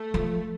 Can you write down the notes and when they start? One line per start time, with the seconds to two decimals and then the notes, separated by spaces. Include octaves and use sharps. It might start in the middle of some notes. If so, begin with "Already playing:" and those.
Already playing: A3
0.14 F3